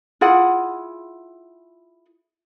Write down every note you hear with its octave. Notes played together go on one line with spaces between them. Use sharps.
E4 F4 G#4 F#5